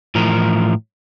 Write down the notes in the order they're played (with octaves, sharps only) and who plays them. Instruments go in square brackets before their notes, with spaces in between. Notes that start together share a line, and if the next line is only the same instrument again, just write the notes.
[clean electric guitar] A2 E3 F3 A#4